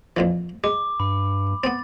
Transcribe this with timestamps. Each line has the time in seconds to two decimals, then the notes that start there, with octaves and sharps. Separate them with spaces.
0.17 F2 A#2 E3
0.64 G#3 D6
1.00 G2 B5
1.64 B3 C4 A6